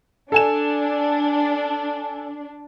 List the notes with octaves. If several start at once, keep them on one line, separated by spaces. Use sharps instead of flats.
D4 A4 G#5 E7